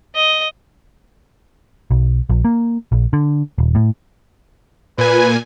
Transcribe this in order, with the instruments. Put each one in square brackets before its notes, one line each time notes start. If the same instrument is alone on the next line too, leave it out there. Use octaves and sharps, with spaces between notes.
[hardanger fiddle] D#5
[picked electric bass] B1
A#1
A#3
A#1
D3
D#1
A2
[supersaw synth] A#2 G#5 [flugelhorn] B4